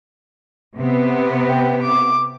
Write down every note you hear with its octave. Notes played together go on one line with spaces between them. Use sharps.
C3 B3
G5
D6